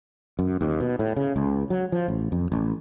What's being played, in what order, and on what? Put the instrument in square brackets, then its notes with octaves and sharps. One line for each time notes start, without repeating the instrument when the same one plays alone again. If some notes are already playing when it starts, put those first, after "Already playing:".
[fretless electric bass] F#2
D#2
B2
A2
C#3
C#2
F#3
F3
A1
F2
A1